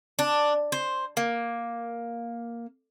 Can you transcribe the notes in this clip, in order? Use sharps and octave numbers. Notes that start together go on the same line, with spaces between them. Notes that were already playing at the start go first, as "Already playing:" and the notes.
D4
C5
A#3